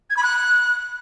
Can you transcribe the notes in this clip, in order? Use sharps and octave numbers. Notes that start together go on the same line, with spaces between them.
G#6
B5
F#6